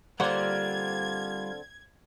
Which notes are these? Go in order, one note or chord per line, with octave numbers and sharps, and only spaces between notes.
D3 G3 A#3 C4 F4 C5 F#5 G#6